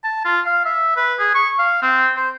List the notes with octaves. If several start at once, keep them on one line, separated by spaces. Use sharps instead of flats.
A5
F4
F5
E5
B4
G#4
C#6
F5
C4
C5